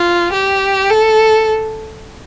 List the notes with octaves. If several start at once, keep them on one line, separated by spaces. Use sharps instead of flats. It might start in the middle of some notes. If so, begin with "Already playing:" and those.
Already playing: F4
G4
A4